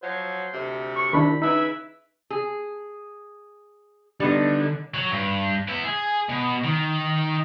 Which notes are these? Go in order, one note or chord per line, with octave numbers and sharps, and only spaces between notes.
F3 F#3 C5
D2 C3
C#6
D#3 D4 E4 B5
C#3 D#4 E4 B4 E5
G#4
D3 G3 B3 D4 D#4
F#3
G2
B3 E5
G#4
B2
D#3